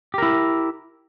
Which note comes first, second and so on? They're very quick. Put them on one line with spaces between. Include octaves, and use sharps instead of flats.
G4 A#4 E4